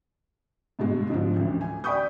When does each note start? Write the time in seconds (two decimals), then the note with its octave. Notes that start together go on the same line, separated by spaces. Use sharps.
0.79 G2 B2 D3 G#3
1.10 G#2 D3 F3
1.36 A1 D2
1.61 G#5
1.84 D5 G5 B5 C#6 D#6 G6